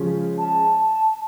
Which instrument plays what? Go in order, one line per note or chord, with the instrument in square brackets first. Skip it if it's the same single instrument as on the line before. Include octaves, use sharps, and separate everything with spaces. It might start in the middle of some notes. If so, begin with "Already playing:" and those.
Already playing: [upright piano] C#3 F3 G#3 C#4
[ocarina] A5